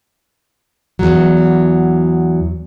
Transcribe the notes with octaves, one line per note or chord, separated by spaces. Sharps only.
E2 G#2 F#3